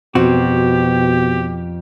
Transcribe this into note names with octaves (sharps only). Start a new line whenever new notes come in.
F2 B2 C4 F#4 G4